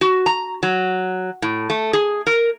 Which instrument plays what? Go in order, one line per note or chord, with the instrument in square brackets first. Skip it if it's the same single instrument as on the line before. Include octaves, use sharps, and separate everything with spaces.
[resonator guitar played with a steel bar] F#4
A#5
F#3
A2
A3
G#4
A#4